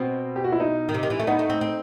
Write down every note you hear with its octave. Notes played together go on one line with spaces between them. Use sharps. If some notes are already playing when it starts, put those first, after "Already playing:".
Already playing: B2 C4
G4
F#4
E4
D#4
D#3
C3
D#3
E3
A3
B3 D#4
A3
C4
C4